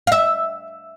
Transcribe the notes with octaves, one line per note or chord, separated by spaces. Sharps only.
E5 F5